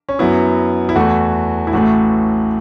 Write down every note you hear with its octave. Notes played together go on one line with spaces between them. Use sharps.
C#4
F#2 F#3 B3 E4
E4
E2 E3 A3 F#4
E4
A1 A2 A3 F#4